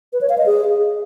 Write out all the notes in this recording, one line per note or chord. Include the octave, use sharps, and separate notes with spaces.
B4
C#5
F5
D#5
G#4